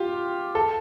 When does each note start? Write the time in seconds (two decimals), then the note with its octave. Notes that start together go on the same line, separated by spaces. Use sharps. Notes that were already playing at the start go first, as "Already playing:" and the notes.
Already playing: F4 G4
0.55 A4